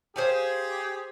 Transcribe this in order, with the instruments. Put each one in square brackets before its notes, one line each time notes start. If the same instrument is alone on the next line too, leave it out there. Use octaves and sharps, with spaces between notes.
[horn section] G4 G#4 [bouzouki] C5 F5 G#5